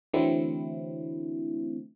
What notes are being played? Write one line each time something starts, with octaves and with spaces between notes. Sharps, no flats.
D3 E3 F#3 A3 C4 E4